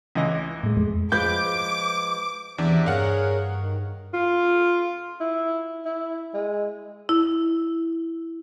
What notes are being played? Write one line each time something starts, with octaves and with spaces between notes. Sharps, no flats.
C#2 E3 D#5
A2 G#3
F2 G#3
F3 G#3 B4 D6 G6
E2 C3 E3 D4 D5 E5
G2 G#4 A#4 C#5 F5 F#5 F6
D#3
F4
E4
E4
G#3
E4